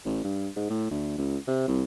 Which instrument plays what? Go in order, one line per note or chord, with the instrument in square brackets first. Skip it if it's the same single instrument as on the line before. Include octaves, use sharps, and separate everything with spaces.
[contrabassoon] A1
G2
G#2
A2
D2
C#2
C3
C2